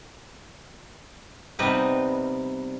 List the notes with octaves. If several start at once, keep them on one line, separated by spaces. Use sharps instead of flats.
C3 G3 B3 D#4 B4